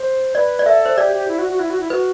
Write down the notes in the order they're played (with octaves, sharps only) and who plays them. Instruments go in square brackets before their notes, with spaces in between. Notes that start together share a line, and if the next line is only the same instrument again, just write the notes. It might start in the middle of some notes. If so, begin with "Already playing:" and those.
Already playing: [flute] C5
[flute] B4 [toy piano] D5
[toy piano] D5
[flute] A4 [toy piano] E5
[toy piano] C5
[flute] G4 [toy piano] D5
[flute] G4
E4
F#4
F#4
E4
F#4
E4
[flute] F#4 [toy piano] B4